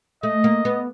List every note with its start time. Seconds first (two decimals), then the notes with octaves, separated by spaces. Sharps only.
0.23 A3 D#5
0.44 A#3
0.65 B3